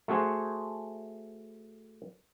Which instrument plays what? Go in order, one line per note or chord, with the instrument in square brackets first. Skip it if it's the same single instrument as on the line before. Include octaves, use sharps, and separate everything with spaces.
[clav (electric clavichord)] A3 F#4 G#4 C5 F#5